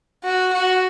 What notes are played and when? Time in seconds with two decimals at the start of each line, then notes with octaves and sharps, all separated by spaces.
0.24 F#4
0.53 F#4